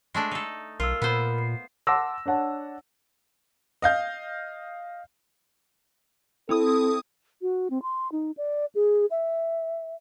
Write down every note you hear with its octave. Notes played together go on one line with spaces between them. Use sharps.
G#3 A3 D4
D#4 A4
B1 F4 A#4 E6
A#2 B3 A#4 C5 B5
C7
F#5 A5 C6 D6 E6 A#6
D4 C#5 F#5 A5
D#5 F5 G6
C4 E4 A4 D#6
F#4
C4
C6
D#4
D5
G#4
E5